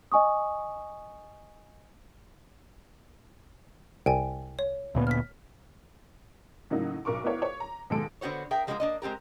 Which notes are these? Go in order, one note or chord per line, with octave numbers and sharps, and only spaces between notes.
D#5 G#5 C#6 D#6
C2 G5 G#5
C#5
D2 A#2 B3
F6 B6
A2 C#3 F#3 A#3 D#4
B1 A#4 C#6 D6
B3 E4 A#4 C#5 F5
C#5
A#5
D#2 B2 G#3 G#4 A4 D7
D3 B3 F#4 C5 C#5
G#4 A#4 E5 G5
F3 G#3 A#3 B3 F#4 A#4
A#3 D4 D#5
G#3 C4 G4 A#4